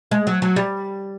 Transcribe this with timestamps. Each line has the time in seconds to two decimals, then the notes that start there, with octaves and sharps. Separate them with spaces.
0.11 G#3
0.27 F#3
0.42 F#3
0.56 G3